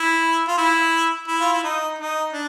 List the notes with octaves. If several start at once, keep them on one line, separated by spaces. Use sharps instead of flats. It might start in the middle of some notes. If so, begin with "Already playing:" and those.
Already playing: E4
F4
E4
E4
F4
E4
D#4
D#4
D4